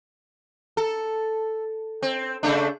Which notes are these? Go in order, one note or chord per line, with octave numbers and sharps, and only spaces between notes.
A4
C4
C#3 A3 D4